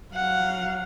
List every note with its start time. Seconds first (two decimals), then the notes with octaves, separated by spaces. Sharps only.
0.14 F#3 F5 F#5